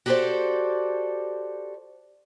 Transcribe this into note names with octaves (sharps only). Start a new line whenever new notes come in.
F#4 G4 A4 A#4 C5 D5